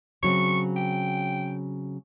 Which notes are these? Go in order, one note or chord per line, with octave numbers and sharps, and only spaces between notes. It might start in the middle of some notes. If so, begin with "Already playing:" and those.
C#3 F#3 C4 C#6
G5